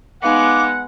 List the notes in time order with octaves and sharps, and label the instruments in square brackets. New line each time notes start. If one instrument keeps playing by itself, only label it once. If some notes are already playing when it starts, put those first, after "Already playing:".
[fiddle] G#3 B3 [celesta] D#4 F5 C#7 [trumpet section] F#5 [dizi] D6